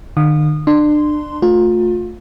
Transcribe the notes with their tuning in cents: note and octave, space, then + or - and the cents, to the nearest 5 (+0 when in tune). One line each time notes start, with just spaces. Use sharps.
D#3 -45 F5 +30 D#6 -25
D4 +30 C6 -10
A3 +0 F4 +30